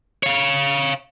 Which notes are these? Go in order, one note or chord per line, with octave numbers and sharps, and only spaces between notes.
C#5 F5